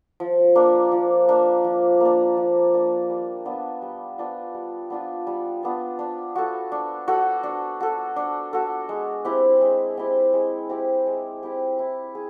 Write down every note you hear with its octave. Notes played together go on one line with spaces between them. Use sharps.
F3
A#3 D4
F3
A#3 D4
F3
A#3 D4
F3
A#3 D4
G3
B3 D4 F4
G3
B3 D4 F4
G3
B3 D4 F4
G3
B3 D4 F4
D4
F#4 A4
D4
F#4 A4
D4
F#4 A4
D4
F#4 A4
G#3
C4 E4 G4
G#3
C4 E4 G4
G#3
C4 E4 G4
G#3
C4 E4 G4
E4
G#4